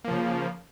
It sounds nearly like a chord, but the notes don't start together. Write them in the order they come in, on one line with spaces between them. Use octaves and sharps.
A#3 F3 C#3